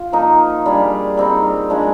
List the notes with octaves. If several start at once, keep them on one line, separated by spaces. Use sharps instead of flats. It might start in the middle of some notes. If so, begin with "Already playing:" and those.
Already playing: F4
F3 A#3 D#4
G3 D4 G#4
G3 C4 D#4
F3 G#3 D4 G#4